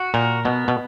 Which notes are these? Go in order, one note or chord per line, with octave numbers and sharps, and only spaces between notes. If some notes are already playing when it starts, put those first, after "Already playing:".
Already playing: F#4
A#2 A#4
B2 B3
B2